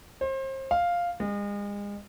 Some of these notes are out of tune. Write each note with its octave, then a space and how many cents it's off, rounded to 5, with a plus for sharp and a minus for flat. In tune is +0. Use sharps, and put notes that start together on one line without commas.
C5 +35
F5 +0
G#3 -35